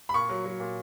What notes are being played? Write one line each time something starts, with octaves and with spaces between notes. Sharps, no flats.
B5
A#2 C#6
F#3
F#3
A#2